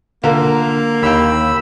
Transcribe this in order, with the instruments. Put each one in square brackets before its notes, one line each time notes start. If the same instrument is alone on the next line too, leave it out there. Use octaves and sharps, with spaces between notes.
[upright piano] D3 F4 A#4 [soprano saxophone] A#3
[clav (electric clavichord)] D#2 G5 [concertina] B5 E6